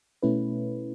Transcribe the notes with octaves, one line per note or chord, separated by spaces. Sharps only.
B2 A3 C#4 E4 B4